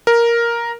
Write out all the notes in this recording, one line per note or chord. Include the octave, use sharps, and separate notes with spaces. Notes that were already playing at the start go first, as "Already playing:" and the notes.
A#4